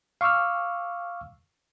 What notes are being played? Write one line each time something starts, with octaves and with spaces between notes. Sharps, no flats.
F5 C#6 D6 E6 F6